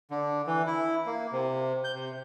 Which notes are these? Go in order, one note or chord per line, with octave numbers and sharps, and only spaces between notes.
D3
E3
E4
A#3
C3
G6
C3